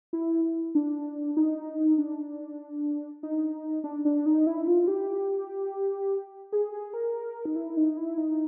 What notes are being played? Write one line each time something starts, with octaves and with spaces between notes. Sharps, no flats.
E4
D4
D#4
D4
D#4
D4
D4
D#4
E4
F4
G4
G#4
G#4
A#4
D#4
E4
D#4
E4
D#4